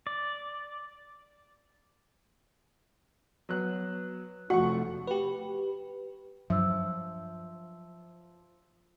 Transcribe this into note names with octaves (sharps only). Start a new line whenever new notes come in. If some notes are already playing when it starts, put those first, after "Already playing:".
D5
F#3 B3 F#6
F1 F3 A3 F#4 F#5 C#6
G4 B4
G2 F3 F#3 E5 E6